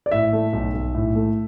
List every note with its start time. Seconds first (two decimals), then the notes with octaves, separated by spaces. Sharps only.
0.06 D5
0.11 A2 E5
0.33 A3
0.53 B1
0.74 B1
0.95 A2
1.15 A3